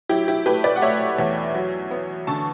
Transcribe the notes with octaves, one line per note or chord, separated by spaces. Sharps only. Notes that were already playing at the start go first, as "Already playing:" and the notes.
F#3 E4 G4
E4 G4
A3 G4 B4
B4 D5
F#5
A3 C#5 E5
E2
F#3
B3
D3 A5 C#6